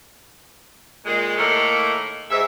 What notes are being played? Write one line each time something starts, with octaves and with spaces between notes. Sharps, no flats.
A#2 D#3 G#3
A2 D#3 A3 A#3
G#2 E5